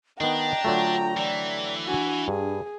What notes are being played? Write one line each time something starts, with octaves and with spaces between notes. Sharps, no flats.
D#3 B3 D4 D#5 G5 A#5
D3 F#3 A3 F4
E3 D5
D4 F#4 G#5
G2 G#4